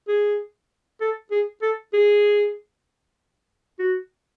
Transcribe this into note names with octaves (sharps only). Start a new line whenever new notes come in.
G#4
A4
G#4
A4
G#4
F#4